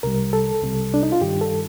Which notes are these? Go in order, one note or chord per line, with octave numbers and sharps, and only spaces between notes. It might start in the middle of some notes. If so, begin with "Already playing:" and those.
C2 C3 G3 A#4
A4
C2 C3 G3
D4
D#4
F4
G2 D#3 G3 G4
A4